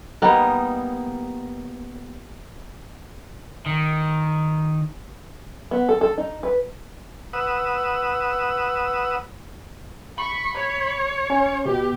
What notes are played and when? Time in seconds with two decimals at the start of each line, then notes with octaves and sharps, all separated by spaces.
0.22 G3 A#3 B3 D#4
3.66 D#3
5.71 B3
5.89 A4
6.01 A4
6.18 D#4
6.43 B4
7.33 B4 F#5 D#6 E6
10.18 B5 C#6
10.55 C#5
11.30 C#4
11.66 B2 G4